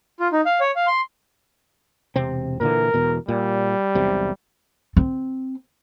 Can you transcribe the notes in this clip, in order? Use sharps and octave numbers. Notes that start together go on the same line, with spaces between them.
F4
D#4
F5
C#5
F5
C6
E1 C3 C4
A#2 D3 E3 A#4
E1 E2 B2
A#2 G3
E1 B1 C3
C4